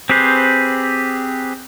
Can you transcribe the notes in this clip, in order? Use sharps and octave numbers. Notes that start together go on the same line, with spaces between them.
C4 G4 G#4 B4 C5